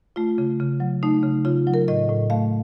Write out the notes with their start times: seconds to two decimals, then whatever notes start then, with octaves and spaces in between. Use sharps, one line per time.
0.16 A3 F4
0.38 C#3
0.60 C#3
0.80 F#3
1.03 A3 D#4
1.23 C#3
1.45 C#3 F4
1.67 F#3
1.74 A#4
1.88 A2 D#5
2.09 A2
2.30 A3 F5